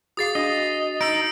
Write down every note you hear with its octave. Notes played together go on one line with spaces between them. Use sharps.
F#4 G#4 F5 D#6 A6 C7
D4 F#4 D#5
D#4 E6 D7